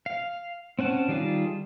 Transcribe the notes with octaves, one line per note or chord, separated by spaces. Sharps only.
F5
C4 C#4 F#5 A5
D#3 G3 F4 G#4 A5